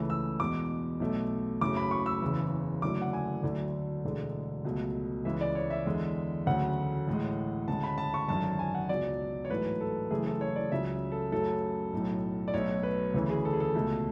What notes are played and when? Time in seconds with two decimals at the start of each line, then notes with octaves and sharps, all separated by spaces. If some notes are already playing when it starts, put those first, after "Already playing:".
Already playing: C#2 C#3 E3 A3
0.10 E6
0.40 E2 B2 G#3 D6
1.00 B1 B2 A3
1.61 F#1 F#2 C#3 F#3 A3 D6
1.76 B5
1.91 C#6
2.06 E6
2.22 F#1 E2 C#3 E3
2.82 F#1 F#2 D3 F#3 A3 D6
3.02 F#5
3.13 G#5
3.43 D2 D3 F#3 A3
4.04 E1 D2 D3 G#3
4.64 C#2 B2 F#3 A3
5.25 C#2 C#3 E3 G#3 E5
5.41 D5
5.55 C#5
5.70 E5
5.86 E2 D3 G#3
6.47 D2 C#3 F#3 A3 F#5
7.08 A1 A2 G#3
7.68 D2 C#3 G#3 A5
7.83 B5
7.98 A5
8.14 C#6
8.28 G#1 F#2 D3 A5
8.44 A5
8.59 G#5
8.75 F#5
8.89 C#2 B2 F#3 D5
9.45 C#5
9.49 A1 G#2 F#3 A3 B4
9.81 A4
10.11 F#1 F#2 E3 A3 G#4
10.26 A4
10.41 C#5
10.56 D5
10.72 C#2 C#3 F#3 E5
11.12 A4
11.32 F#2 C#3 F#3 A3 A4
11.93 B1 A2 F#3
12.48 D5
12.53 B1 B2 F#3 A3 C#5
12.83 B4
13.14 D2 C#3 E3
13.30 G#4
13.45 A4
13.53 G#4
13.60 A4
13.75 C#2 B2 A3